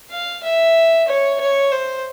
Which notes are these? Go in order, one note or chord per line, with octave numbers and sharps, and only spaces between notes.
F5
E5
C#5
C#5
C5